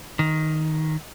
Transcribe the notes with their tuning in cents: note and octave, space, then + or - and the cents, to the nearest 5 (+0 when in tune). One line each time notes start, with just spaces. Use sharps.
D#3 +5